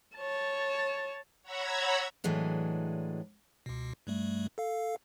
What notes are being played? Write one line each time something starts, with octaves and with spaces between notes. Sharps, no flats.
C#5 A5
C#5 F#5 A#5 B5 E6 G#6
A2 E3 F#3 G#3 D4
C#2 B2
G2 G3 A3
A4 F5